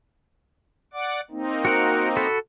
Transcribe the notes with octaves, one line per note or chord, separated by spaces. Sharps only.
D5 F#5 D6
A#3 C4 D#4
F#4 A#4 F#5
F#4 A4 B5